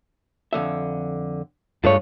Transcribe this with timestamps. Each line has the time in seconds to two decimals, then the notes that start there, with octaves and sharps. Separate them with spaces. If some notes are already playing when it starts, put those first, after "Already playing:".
0.53 F2 D3 E5
1.84 G2 G#3 A3 F4 C#5